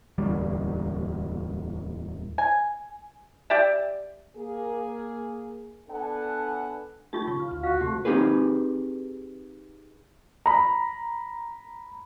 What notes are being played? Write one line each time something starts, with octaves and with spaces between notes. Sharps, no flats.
D1 E2 G3
G#5
G4 D5 E5
A#3 G#4
B3 D4 A4 F#5 G#5 A5
A3 D#4 F4 G4 C#6 A6
C#3 C#6
F4
D2 F4
F#4 F5
C3 A3 G4
C4 D#4 G4 G#4 B4
A#5 B5